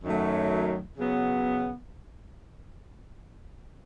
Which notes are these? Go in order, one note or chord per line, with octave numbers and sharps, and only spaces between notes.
F#2 D#3 F#3 A3
C#3 F#3 B3